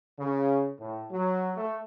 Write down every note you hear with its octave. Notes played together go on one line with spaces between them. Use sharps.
C#3
A2
F#3
A3